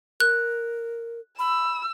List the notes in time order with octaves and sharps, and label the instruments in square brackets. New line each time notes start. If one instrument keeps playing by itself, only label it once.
[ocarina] A#4 [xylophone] F#6
[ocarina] B5 [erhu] E6